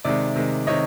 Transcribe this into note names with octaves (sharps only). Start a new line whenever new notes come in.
C3 D#3 G#3 D5 E5
C3 D#3 G#3
C3 D#3 C#5 D#5